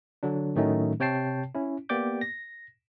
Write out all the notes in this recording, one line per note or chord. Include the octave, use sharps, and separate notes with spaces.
D3 F#3 D4
A2 D#3 F#3 A3 C#4 D#4
C3 C#5 G5 A5 C7
C#4 E4
A#3 B3 G4 D5 D6 G6
A#6